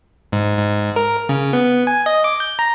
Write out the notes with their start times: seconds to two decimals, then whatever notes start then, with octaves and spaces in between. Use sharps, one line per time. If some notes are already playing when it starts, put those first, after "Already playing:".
0.32 G#2
0.57 G#2
0.96 A#4
1.29 C#3
1.53 B3
1.87 G#5
2.06 D#5
2.24 D6
2.40 G6
2.59 A#5